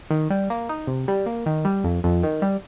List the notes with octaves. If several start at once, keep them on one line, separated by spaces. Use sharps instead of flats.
D#3
G3
A#3
D#4
C3
G3
A#3
D#3
G3
F2
F2
D#3
G3